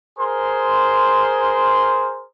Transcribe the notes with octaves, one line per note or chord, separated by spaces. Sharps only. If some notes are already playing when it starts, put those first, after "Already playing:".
G#4 A#4 C5 C6